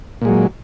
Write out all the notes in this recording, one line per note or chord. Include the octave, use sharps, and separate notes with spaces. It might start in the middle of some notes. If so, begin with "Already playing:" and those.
A#2 F#3 G#3